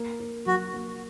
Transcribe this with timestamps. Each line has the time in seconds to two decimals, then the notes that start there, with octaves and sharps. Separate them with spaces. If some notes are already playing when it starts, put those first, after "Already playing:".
Already playing: A#3
0.20 A#3
0.46 F#3 F#4
0.74 A#3